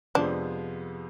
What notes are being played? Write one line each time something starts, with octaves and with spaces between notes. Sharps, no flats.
F2 C3 F3 G#3 B3 D4